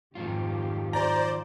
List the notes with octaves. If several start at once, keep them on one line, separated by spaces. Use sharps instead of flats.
F2 G#2 D#3 F#3 F4 G4
C5 D5 A#5 G6